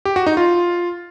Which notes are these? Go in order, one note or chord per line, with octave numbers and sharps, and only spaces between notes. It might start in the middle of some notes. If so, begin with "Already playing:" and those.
G4
F#4
D#4
F4